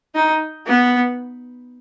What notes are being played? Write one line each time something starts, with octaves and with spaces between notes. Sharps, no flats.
D#4
B3